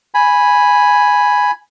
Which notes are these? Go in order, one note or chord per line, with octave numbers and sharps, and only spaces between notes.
G#5 B5